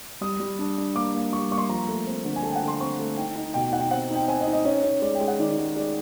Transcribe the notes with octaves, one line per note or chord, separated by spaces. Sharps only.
G3 D#6
G3
D4
D4
A#3 D6
A#3
G3 C#6
A#3 C#6
C6
F3 A#5
A3
C4
D3
G#5
A3 A5
G5
F#5
D3
C6
C4 C#6
A3
D#4 G5
D#4
B2 G5
D#4 F#5
G5
C4 F#5
D#4
G5
C4 G#5
D#5
D#4
D#5
C#4
C#4
G#3 D5
G5
G#3
F#5
D#3 D5
G#3
G#3 D5